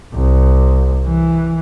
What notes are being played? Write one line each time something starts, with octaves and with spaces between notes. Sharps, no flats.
C2
E3